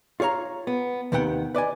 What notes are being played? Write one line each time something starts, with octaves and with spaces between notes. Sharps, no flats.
F4 G#4 C#5 F5 A#5
B3
D#2 C3 D#3 B3 F#5 G5
B4 D5 D#5 G#5